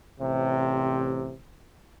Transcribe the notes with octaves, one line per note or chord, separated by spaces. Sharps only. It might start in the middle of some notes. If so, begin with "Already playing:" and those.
A1 C3